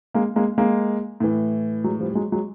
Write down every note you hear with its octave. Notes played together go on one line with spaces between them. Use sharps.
G#3 A#3
G#3 A#3
G#3 A#3
A2 E3
F#3 G#3
F3 G3
G3
F#3 G#3
F#3 G#3